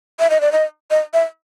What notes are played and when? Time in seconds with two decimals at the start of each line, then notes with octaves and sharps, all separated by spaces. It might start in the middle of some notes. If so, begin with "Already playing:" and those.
0.20 E5
0.30 D#5
0.41 D5
0.52 D#5
0.91 D#5
1.14 E5